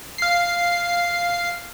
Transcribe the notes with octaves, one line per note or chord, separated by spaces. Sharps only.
F5 C7